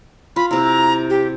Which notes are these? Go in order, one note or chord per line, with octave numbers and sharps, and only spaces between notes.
F4 B5
C3 E4 A#5
G4